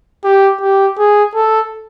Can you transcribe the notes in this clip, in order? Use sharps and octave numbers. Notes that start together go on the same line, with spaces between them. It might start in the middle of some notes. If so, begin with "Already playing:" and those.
G4
G4
G#4
A4